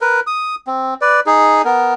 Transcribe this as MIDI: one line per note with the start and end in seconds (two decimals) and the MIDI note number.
0.01 0.20 70
0.01 0.20 71
0.27 0.55 87
0.67 0.94 60
1.01 1.20 71
1.01 1.20 74
1.26 1.62 63
1.26 1.62 68
1.65 1.94 59
1.65 1.94 70